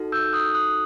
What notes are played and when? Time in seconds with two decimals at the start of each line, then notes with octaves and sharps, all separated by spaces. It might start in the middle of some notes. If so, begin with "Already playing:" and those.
Already playing: D#4 F#4 A4
0.12 E6 G6
0.33 D#6 F#6
0.54 D#6 F#6